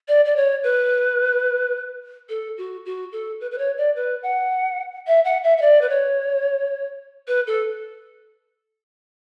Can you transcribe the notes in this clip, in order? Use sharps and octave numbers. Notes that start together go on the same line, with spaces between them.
D5
D5
C#5
B4
A4
F#4
F#4
A4
B4
B4
C#5
D5
B4
F#5
E5
F#5
E5
E5
D5
B4
C#5
B4
A4